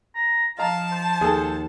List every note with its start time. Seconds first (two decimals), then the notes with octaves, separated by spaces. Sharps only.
0.15 A#5
0.59 F3 D#5 F5 A5 A#5
0.92 C5
1.21 D#2 G#4 A4